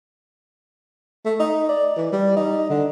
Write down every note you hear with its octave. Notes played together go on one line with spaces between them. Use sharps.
A3
D#4
D5
E3
G3
D#4
D3